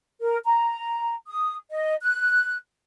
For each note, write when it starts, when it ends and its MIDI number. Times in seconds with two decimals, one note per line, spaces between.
0.21 0.36 70
0.45 1.14 82
1.28 1.55 87
1.70 1.95 75
2.02 2.55 90